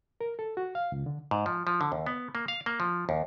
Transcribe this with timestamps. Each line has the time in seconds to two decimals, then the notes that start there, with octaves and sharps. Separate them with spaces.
0.21 A#4
0.39 A4
0.57 F#4
0.75 F5
0.92 C#2
1.06 D3
1.31 G#2
1.46 F3
1.67 F3
1.81 D3
1.92 D#2
2.07 B3
2.35 A#3
2.48 F5
2.66 A#3
2.80 F3
3.09 D#2